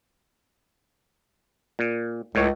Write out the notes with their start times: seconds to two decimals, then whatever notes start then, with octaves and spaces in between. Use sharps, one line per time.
1.79 A#2
2.35 C#2 A2 C#5